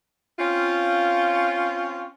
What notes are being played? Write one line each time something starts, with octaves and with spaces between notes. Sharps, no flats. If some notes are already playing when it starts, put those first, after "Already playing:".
C4 C#4 F4